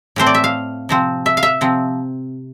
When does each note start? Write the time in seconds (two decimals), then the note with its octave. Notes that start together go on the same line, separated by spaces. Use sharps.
0.16 A2 E3 A3 C4 C5
0.26 D5
0.35 E5
0.44 F5
0.89 C3 F3 C4
1.26 E5
1.37 F5
1.43 E5
1.61 C3 F3 C4